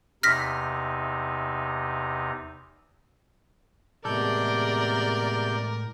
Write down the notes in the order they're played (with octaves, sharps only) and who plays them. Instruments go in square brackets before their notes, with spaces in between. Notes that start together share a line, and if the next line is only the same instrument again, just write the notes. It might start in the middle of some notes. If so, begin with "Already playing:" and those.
[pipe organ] E2 C3 D#4 [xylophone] F6 A#6 B6
[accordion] E2 C3 G6 [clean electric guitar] A2 G#3 A4 [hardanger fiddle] A#4 [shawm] D5